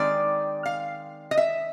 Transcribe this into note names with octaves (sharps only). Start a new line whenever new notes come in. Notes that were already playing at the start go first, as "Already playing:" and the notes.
Already playing: D#3 G#3 C4 D5
F5
D#5
E5